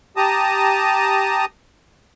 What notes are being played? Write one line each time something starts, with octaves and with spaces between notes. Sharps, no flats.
G4 A5 A#5 D#6